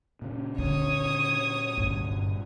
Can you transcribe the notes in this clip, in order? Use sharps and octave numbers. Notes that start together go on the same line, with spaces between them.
A#2 C#3
D3 C#5 D#6
G1 G2